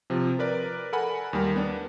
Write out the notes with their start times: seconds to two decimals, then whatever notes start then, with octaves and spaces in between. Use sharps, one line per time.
0.10 C3 F3
0.39 A#4 B4 D5
0.92 A4 A#4 F#5 G#5 B5
1.33 D#2 G3 A#4
1.56 B3 D4